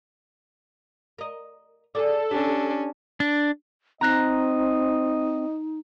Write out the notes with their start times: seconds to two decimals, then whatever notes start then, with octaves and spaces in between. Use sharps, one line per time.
1.18 A#4 D#5
1.95 G#4 A4 D5
2.31 C#4 D4 G4
3.20 D4
4.01 C4 D#4 D#5 A#5 F#6 A#6